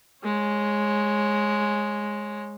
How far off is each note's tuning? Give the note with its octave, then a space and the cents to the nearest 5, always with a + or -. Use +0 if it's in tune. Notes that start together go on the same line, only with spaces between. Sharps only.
G#3 +0 C#5 -25